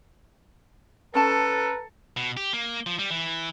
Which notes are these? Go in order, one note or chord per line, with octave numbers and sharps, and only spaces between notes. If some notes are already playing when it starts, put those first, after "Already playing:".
C#4 A4 B4 A5 A#5
B2
G4
A#3
F3
G3
E3